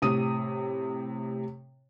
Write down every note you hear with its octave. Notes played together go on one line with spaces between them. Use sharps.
A2 C3 D#6 D#7